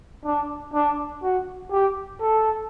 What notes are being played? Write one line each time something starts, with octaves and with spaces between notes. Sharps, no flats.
D4
D4
F#4
G4
A4